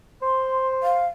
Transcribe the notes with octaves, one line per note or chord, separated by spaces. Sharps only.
C5 C6
F5